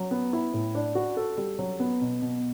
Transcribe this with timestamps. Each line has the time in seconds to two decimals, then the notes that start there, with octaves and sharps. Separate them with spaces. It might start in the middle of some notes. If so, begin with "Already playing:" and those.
Already playing: F#3
0.11 B3
0.33 E4
0.54 A2
0.75 D4
0.95 F#4
1.17 A4
1.37 G3
1.59 F#3
1.80 B3
2.01 B2
2.22 B2